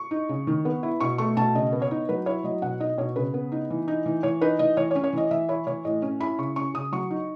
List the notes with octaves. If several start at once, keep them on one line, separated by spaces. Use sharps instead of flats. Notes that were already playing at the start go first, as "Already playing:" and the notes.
Already playing: C#6
D#4
C#3
D#3
B3
E4
B2 C#6
A3 C#6
B2 A5
C#3 D#5
B3
C#5
D#4
F#3 B4
E4 C#5
F#3 D#5
B2 F#5
D#4 D#5
B2 C#5
C#3 B4
B3
D#4
E3
D#4
E3
E3 C#5
D#4 B4
E3 D#5
E3 C#5
C#5
C#4
C#5
E3 D#5
E3 E5
E4 C#5
E3 C#5
A2 D#5
C#4
E4 B5
C#3 C#6
C#4 C#6
C#3 D#6
F#3 C#6
D#4